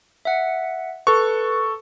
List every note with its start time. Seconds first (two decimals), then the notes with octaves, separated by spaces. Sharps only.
0.25 E5 F#5
1.07 A4 B4 C#6